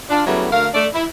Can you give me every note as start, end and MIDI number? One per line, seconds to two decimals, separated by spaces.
0.10 0.25 62
0.10 0.25 65
0.26 0.49 49
0.26 0.49 54
0.26 0.49 55
0.26 0.49 57
0.26 0.49 59
0.26 0.49 64
0.52 0.67 38
0.52 0.67 50
0.52 0.67 57
0.52 0.67 70
0.52 0.67 77
0.74 0.87 57
0.74 0.87 74
0.94 1.05 64